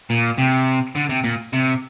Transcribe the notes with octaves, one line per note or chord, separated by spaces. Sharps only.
A#2
C3
D3
C3
A#2
C3